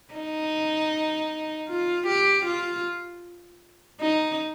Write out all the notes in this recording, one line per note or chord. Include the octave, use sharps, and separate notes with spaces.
D#4
F4
G4
F4
D#4